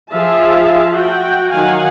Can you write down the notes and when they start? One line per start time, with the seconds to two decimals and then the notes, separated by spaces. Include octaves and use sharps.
0.12 F3 G#4 E5 F5 A5
0.94 F#4 F#5 G5
1.51 D#3 F#3 F5 F#5 G#5